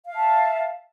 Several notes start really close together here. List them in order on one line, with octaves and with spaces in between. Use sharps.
F5 E5 A5